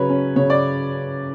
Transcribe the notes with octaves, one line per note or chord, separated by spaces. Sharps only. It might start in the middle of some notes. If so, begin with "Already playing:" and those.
Already playing: C#3 F#3 B4 C#5
C#4
C#3 C#5
D5